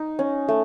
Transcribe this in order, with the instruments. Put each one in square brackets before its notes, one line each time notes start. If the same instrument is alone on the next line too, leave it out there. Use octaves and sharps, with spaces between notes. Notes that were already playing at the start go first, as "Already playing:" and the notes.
Already playing: [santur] D#4
C#4
A3